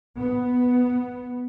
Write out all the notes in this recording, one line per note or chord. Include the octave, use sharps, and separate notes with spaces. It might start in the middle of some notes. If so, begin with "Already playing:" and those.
B3